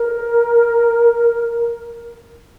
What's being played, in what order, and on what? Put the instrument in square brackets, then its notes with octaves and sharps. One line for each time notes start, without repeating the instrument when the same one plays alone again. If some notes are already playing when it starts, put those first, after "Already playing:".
Already playing: [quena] A#4